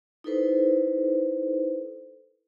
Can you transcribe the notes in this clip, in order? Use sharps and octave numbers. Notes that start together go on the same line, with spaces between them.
D#4 E4 A4 B4 C5